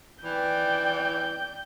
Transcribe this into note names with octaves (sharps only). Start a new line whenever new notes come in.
E3 D5 G5 G6